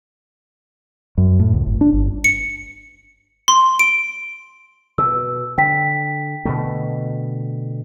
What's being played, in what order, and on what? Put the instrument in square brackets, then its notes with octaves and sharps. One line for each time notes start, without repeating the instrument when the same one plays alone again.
[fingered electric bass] F#2
A2
C#2
G1
D4
G1
[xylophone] C#7
C6
D7
[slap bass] B2 [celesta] E6
[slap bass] D3 [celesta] G5 B6
[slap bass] B2 D3 A3